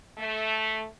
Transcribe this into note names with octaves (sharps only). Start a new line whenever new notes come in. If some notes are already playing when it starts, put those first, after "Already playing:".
A3